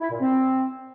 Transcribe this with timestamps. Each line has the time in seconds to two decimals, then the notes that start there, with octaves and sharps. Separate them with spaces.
0.01 E4
0.11 A#2
0.21 C4